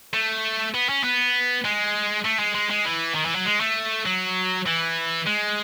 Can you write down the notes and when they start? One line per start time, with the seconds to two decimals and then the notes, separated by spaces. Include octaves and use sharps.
0.14 A3
0.74 B3
0.89 C#4
1.04 B3
1.65 G#3
2.25 A3
2.39 G#3
2.54 G#3
2.70 G#3
2.85 E3
3.15 D#3
3.25 E3
3.35 F#3
3.45 G#3
3.60 A3
4.06 F#3
4.66 E3
5.27 G#3